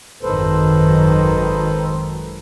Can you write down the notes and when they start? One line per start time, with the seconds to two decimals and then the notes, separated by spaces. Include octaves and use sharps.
0.23 G#1 F#2 D#3 A4 B4 C5